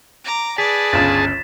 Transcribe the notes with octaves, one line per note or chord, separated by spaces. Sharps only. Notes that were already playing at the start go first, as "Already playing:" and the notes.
A#5 D6
G#4 B4 D5 A5 B6
G1 C#2 C#3 A6 E7